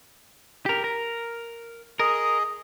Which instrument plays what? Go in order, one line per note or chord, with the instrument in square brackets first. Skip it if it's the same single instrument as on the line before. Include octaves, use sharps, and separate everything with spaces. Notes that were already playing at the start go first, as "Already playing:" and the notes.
[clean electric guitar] G4 A#4
A#4
[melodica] G#4 D#5 [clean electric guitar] A#4